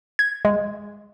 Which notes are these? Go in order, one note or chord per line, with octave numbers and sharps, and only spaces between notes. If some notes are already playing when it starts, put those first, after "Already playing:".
G#6
G#3